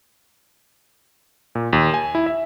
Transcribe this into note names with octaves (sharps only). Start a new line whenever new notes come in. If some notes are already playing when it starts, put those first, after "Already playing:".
A#2
D#2
G#5
E4
E5